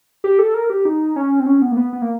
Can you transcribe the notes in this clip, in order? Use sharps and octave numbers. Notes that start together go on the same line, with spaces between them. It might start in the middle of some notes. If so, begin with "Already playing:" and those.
G4
A4
A#4
G4
D#4
C#4
C4
C#4
B3
A#3
B3
B3
A#3